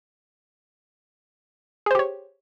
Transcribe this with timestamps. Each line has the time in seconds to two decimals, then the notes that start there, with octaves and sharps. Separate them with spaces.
1.86 G#4
1.91 C5
1.95 G4
1.99 C#5